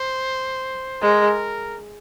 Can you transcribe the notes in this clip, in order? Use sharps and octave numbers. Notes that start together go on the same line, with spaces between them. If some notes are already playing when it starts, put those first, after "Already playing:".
Already playing: C5
G#3 A#4